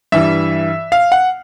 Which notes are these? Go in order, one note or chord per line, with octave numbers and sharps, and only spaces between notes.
G2 E3 G3 E5
F5
F#5